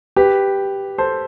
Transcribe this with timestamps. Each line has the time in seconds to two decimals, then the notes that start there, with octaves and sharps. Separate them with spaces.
0.16 G4 B4
0.98 A4 C5